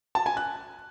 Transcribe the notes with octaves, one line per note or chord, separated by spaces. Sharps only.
A5
G#5
F#6